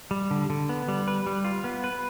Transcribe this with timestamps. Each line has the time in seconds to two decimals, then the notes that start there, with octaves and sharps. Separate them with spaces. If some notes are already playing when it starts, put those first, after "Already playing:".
0.11 G3
0.31 D3
0.50 D3
0.69 B3
0.88 G3
1.08 B4
1.26 G3
1.45 F4
1.64 B3
1.84 B4